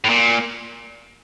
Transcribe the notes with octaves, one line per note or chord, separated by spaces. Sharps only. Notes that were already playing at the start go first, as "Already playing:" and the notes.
A2
A#2